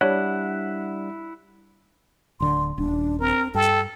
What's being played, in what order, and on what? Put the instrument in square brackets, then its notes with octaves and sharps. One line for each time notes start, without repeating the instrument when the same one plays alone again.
[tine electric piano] G3 D4 [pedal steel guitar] E4 F#5 [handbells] C#5
[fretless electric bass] D1 D3 [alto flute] C6
[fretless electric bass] D#1 [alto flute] D4
[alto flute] C4 [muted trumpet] A#4
[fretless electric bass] G2 [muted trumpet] A4 [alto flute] G5